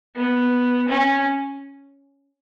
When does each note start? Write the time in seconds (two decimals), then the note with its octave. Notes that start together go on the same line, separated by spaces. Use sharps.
0.16 B3
0.88 C#4